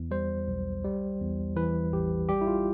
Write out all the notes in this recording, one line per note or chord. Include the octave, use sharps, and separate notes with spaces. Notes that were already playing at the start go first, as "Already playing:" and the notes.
Already playing: E2
G3 C5
B1
G3
E2
E3 B4
A1 G4
G3 G4
E4
F4